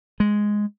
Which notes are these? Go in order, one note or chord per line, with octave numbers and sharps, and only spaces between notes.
G#3